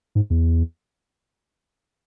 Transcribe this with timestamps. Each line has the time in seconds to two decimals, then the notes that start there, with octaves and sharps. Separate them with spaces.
0.15 G#2
0.30 E2